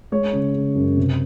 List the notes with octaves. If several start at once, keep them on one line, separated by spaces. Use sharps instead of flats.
G#3 C#5
C#3
C#3
F#2
C3